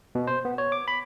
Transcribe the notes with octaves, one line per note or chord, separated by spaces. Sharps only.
B2
C5
B3
C#5
D6
B5